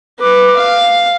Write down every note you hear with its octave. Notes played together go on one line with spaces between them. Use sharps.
B4 D6
F5